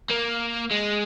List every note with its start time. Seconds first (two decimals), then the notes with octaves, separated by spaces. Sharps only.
0.11 A#3
0.71 G#3